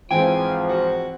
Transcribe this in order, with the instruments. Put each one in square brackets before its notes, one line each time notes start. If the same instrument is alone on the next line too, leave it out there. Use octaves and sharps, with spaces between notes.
[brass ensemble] G#2 F3 [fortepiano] E3 C4 [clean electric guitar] G5 [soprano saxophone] G#5
[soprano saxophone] F#4